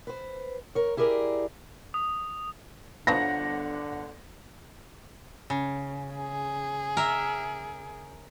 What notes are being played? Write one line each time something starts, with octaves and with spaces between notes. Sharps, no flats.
B4 C5
A#4 C#5
E4 G4 G#4 A#4 D5
D#6
G1 D3 F3 F#3 B3 D4 F#5 A#6
C#3
G#4
A#4 E5